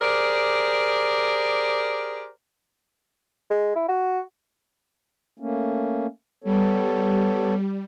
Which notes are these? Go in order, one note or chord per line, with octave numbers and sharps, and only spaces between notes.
G4 G#4 A#4 C5 D5
G#3
E4
F#4
A3 A#3 C#4
G3 B3 A4 C#5